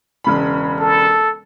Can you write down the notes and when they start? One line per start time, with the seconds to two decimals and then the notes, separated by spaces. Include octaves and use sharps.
0.24 E1 C#3 B5
0.80 A4